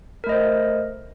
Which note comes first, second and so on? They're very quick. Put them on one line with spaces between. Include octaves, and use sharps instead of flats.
A#4 A3 D#5 C5